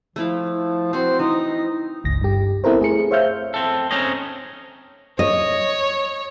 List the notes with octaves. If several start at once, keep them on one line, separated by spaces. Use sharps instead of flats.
F3 A3 E4 F5
C4 F#4 C5
E3 D#4
G1 C#2 A#6
G2 G4
B3 C4 E4 A4 A#4 C5
A3 G#4 C#7
C5 C#5 E5 F5 F6 G6
C4 A4
C4 C#4 D#4 C#5 D#5
C#5 D#5